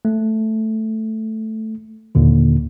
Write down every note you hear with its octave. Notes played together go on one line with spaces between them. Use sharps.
A3
D#2 A#2 D3